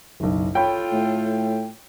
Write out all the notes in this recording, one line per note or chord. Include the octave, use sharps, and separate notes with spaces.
F#1 B1
F4 A4 C#5 G5 B5
A2